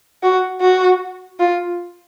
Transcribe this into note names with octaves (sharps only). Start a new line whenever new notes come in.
F#4
F#4
F4